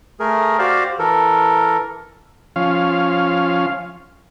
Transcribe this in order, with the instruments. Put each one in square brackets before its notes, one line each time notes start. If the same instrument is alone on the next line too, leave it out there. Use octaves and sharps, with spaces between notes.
[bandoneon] A3 G#4 A#4
F#4 G4 C5 D5 F5
E3 A4 A#4
[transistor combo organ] F3 C#4 F5